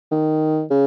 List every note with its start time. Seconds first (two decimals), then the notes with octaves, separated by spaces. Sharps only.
0.12 D#3
0.71 C#3